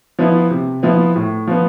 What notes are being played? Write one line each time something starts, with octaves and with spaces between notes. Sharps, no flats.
F3 B3 E4
C3
F3 B3 E4
A2
F3 B3